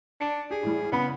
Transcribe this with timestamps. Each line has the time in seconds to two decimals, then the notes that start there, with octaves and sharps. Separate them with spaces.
0.21 D4 C#7 D7
0.51 G4 G#4
0.63 A2 E3 G3
0.92 C#3 B3 B5